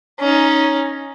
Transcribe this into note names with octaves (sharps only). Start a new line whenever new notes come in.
C#4 D#4